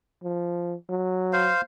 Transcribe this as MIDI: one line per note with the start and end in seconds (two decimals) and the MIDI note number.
0.23 0.74 53
0.89 1.51 54
1.33 1.61 72
1.33 1.61 77